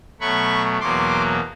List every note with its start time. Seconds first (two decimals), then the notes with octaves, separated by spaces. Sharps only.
0.20 B2 F#3 A3 B5 C#6
0.80 E2 B2 F#3 A#3 C6 D6